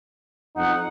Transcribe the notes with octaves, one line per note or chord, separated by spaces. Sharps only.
F2 D#4 F#5